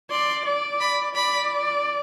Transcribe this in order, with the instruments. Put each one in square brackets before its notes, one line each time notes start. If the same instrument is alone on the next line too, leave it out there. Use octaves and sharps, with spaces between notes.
[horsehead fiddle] D5 [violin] C6
[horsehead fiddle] D5
[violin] B5
[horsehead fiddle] D5 [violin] B5